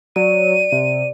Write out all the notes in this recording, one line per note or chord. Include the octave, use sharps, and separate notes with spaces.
F#3 D5 D#7
C3